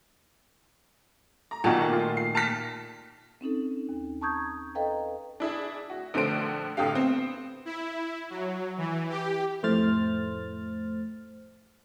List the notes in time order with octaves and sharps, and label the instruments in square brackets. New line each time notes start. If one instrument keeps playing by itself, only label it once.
[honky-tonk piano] A#5
[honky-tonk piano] B1 F#4 A5 [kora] A#2 D#3 A3
[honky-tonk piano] F4
C7
A5 F6 B6
[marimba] C4 C#4 D#4 A4
D#2
A5 A#5 C#6 D#6 G6 G#6
A4 B4 D#5 F5 G5 A#5
[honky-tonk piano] D4 E4 G#4
F#4
A#1 D3 A3 D4 C5 D7
A1 A2 D3 G4 F5
B3 C4
[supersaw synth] E4
F#3
E3
G4
[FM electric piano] F2 A2 A3 C5 F6 A6